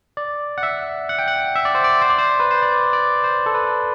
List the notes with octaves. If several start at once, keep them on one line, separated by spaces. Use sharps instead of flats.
D5
F#5
E5
F#5
G5
F#5
E5
D5
C5
D5
C5
D5
C5
B4
C5
D5
D5
C5
A4
B4